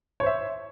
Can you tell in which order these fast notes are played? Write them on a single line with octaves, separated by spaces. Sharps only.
C#5 C5 E5